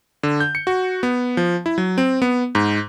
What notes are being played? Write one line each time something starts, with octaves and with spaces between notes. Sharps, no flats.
D3
G6
C#7
F#4
B3
F3
E4
F#3
C4
B3
G#2